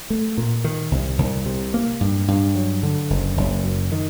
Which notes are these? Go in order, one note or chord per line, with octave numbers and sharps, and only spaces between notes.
A3
A#2
D#3
C2
C2
C3
A#3
G2
G2
F#3
D3
F#1
F#1
F#2
D#3